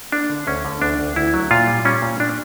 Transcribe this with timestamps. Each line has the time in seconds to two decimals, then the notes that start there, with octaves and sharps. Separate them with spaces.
0.12 A#3 D4
0.30 D3
0.47 D2 C#4
0.65 D3
0.82 D2 D4
0.99 D2
1.16 D2 E4
1.34 F#3
1.51 A#2 F4
1.67 G3
1.85 G3 C#4
2.02 A#2
2.20 A#2 D4